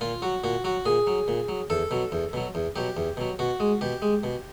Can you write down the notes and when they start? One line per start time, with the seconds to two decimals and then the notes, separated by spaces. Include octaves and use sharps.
0.01 A#2 F4
0.22 F#3 F#4
0.44 A#2 F#4
0.64 F#3 F#4
0.86 A#2 G#4
1.07 F#3
1.28 A#2
1.49 F#3
1.70 E2 A4
1.91 B2 F#3
2.12 E2
2.33 B2 F#3
2.55 E2
2.76 B2 F#3 G4
2.97 E2
3.17 B2 F#3
3.39 B2 F#4
3.60 G#3
3.81 B2 G4
4.02 G#3
4.24 B2